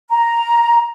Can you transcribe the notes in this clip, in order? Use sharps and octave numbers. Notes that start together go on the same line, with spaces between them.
A#5